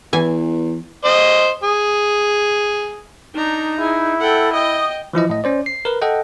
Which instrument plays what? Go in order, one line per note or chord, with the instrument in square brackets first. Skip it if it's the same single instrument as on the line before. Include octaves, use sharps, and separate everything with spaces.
[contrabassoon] E2 [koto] E3 G#5
[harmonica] C5 D#5
G#4
[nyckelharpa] D4 A#5 [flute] D#4
[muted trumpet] E4 [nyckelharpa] G#4
[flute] A4 [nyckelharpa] F#5 G5
[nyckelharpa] D#5 G5 [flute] D#6
[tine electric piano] E3 F3 E4 D#5
A2 D#5
C#4 C5 D5
C7
A#4 B4
A4 D#5 F#5 G5